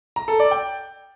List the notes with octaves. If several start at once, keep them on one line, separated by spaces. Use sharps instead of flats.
A#5
A4
D5
G5